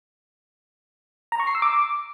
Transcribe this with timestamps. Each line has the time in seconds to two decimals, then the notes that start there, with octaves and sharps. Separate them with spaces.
1.32 A#5
1.40 C#6
1.47 C7
1.55 E6
1.62 D6